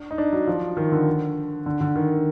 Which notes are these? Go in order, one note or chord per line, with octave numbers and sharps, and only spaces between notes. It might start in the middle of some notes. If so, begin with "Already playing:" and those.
Already playing: D4
D#4
D4
F#3
F3
D#3
D3
D3
D3
D#3